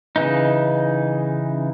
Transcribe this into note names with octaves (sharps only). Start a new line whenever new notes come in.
C#3 E3 D#4